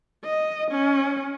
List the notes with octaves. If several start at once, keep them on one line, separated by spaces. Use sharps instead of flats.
D#5
C#4